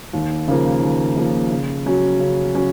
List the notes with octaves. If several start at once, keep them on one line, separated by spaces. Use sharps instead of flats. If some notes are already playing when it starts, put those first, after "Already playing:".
D#2
C#3 F3 A#3
D#2
C#3 F3 A#3
C#3
F#3 C#4 F#4
C#3
F#3 C#4 F#4